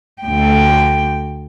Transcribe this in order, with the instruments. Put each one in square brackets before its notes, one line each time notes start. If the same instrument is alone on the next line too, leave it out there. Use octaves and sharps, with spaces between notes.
[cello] D2 G5